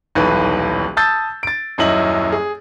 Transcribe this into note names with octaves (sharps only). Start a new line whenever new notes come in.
D#1 B1 E3 B4
A5 D#6 E6 G6 A6
A6 D7
D#1 F#2 C#4 E4 D#5 F#7
G#4